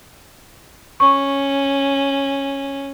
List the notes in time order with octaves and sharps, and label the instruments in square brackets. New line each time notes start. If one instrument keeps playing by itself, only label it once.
[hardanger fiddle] C#4 [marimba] C#6